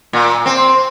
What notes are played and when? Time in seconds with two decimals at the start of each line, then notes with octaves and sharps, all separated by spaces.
0.13 A#2
0.46 C4